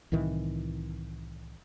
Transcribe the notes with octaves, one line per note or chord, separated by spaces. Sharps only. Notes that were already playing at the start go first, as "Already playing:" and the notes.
C2 A2 D#3 E3